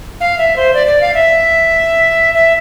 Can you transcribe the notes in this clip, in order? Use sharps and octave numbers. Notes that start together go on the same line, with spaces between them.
F5
E5
C5
D5
D5
F5
E5
E5